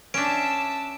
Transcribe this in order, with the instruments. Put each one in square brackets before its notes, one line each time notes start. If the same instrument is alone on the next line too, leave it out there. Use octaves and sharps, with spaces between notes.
[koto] C#4 D4 [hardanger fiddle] E5 A5 [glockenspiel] D7